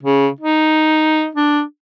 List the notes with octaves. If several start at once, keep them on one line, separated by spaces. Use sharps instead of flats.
C#3
D#4
D4